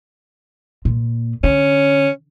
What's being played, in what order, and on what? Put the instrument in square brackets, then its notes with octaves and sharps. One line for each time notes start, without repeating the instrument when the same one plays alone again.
[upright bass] A#2
[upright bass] D3 [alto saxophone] C#4